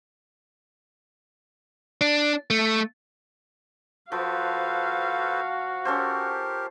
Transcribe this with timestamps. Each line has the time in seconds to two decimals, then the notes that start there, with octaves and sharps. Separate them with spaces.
2.01 D4
2.50 A3
4.12 F3 F#4 A4 B4 C5 F5
5.85 C#4 G4 A4 A#4 C5